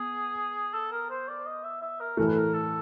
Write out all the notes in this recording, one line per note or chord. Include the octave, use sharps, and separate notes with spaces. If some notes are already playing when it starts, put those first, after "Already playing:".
Already playing: B3 G#4
A4
A#4
C5
D5
D#5
E5
E5
A#4
A2 E3 A3 A#4
B4
A#4
A4